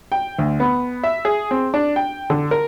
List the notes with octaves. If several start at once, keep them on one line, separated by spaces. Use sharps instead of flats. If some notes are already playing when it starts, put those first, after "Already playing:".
G5
D2
B3
E5
G#4
C4
D4
G5
D3
A#4